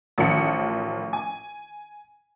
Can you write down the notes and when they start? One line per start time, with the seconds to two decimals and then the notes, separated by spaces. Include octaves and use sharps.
0.18 A1 D#3 F3 F#5 C#7
1.13 G#5